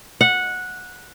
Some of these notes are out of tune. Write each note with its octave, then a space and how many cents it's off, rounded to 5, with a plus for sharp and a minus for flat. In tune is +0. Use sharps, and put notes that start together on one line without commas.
F#5 -10